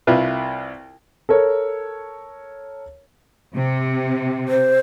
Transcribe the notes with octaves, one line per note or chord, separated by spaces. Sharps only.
C2 E4 F4 B4
A4 A#4 C#5
C3
C5